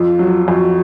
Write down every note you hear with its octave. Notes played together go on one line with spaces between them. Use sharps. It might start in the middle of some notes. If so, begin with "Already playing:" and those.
Already playing: F2 F4
F#3
F2 F#4